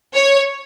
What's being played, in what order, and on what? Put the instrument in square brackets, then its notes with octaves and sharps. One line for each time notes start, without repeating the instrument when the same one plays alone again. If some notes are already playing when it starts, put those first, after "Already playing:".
[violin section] C#5